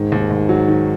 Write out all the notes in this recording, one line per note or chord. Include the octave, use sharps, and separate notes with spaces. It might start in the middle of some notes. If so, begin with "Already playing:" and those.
Already playing: G#2 D#3
D#2
D#2
F#3
D#3